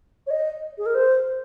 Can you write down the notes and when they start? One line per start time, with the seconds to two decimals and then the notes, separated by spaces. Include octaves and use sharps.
0.27 C#5
0.31 D#5
0.78 G#4
0.86 A#4
0.95 C5